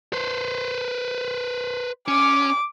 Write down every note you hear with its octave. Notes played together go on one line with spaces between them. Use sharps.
B4 C5
C#4 D6